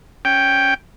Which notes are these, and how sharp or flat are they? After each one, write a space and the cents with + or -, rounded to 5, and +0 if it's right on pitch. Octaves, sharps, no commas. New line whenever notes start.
C#4 +0 G5 +0